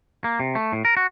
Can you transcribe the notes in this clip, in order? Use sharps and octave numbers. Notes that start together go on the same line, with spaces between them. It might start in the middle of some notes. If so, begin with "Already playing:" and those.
A#3
C3
A3
A2
A#4
F#4